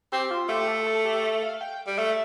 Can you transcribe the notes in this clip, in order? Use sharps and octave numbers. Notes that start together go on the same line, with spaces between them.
C4 G4
F4
A3 G4
A4
A4
G4
A4
F5
G5
G3
A3 E5